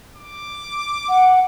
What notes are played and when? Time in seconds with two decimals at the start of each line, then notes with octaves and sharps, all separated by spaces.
0.16 D6
1.08 F#5